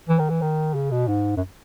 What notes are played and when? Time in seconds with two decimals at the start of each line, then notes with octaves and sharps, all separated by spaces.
0.09 E3
0.19 D#3
0.30 E3
0.42 D#3
0.74 C#3
0.91 B2
1.08 G#2
1.37 F#2